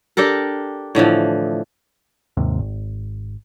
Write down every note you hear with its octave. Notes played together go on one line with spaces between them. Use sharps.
D4 G4 A4 A#4
A2 D3 E3 F3
D#2 G#2 C3
G#1